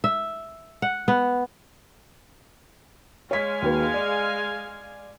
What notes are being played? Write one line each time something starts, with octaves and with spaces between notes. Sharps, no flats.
E5
F#5
B3
G#3 C#5 F5 G#5 B6
D#2 F#4 B4
D5